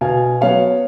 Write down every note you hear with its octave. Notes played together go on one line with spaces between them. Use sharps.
B2 F5 G#5
F#3 B3 C#5 F5